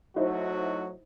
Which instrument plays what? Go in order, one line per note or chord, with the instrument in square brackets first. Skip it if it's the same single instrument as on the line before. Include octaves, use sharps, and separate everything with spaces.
[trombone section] F#3 A3 F#4 [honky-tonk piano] D#4 E4 C5